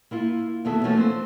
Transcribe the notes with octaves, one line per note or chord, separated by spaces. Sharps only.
A#3 E4 F4
E2 B2 D#3 A#3 A4 E5
E3 F3 A3 A#3 C#4 F#4
C4 A4 C5